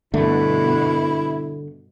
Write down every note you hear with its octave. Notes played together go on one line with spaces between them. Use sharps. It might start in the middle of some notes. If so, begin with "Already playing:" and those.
G2 B2 D3 A3 E4